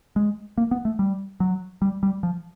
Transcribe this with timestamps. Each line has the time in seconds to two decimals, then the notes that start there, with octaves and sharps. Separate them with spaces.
0.16 G#3
0.58 A#3
0.71 B3
0.85 A3
0.99 G3
1.40 F#3
1.82 G3
2.03 G3
2.23 F3